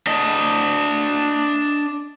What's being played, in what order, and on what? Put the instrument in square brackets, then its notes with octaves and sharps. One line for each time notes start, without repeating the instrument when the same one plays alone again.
[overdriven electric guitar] D4 D#5